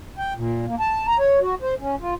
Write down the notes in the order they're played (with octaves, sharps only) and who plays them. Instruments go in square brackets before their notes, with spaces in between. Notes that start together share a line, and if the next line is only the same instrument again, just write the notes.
[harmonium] G5
A#2
A#3
A5
A#5
C#5
F#4
C5
C#4
F4